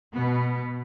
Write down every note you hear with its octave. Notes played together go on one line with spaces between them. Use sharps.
B2 B3